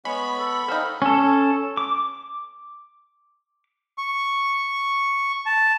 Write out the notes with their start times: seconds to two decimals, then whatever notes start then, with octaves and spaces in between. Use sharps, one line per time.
0.05 G#3 B3 C#5 B5 C#6
0.39 A4
0.68 C4 D#4 A4 F5
1.02 C#4 A4
1.77 D6
3.98 C#6
5.46 A5